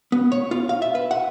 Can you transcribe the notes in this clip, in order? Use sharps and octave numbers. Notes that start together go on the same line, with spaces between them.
B3
C#5
F4
F5
E5
B4
F#5